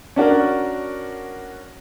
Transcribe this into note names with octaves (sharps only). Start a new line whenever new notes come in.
C#4 D4 F#4 A#4